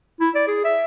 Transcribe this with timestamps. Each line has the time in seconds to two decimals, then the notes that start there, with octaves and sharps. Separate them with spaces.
0.20 E4
0.35 D5
0.47 G#4
0.64 E5